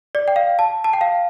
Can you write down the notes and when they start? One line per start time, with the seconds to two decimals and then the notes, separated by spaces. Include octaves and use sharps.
0.15 D5
0.28 G5
0.36 F5
0.59 A5
0.84 A5
0.93 G5
1.01 F5